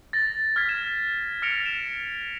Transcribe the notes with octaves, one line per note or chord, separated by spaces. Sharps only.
A6 A#6
F6 G#6 B6
E7
F6 A#6 C#7 D7 F7
E7